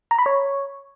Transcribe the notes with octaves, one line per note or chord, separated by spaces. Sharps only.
A#5
B5
C#5